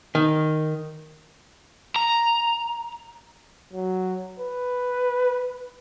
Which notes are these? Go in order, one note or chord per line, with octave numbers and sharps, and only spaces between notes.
D#3
A#5
F#3
B4